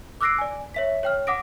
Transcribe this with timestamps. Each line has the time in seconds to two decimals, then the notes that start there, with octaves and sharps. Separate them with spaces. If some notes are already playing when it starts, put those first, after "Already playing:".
0.21 D6 E6 F#6 A#6 C7 D7
0.38 D5 G#5
0.74 C#5 E5 B6
1.03 C#5 G5 F6
1.27 F#5 D6 D#6 A#6 D7